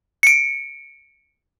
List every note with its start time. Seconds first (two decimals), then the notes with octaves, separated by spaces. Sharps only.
0.23 C#7 D7